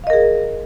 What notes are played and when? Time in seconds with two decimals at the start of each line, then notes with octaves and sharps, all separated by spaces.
0.04 F5
0.07 D#5
0.10 A#4
0.13 G#4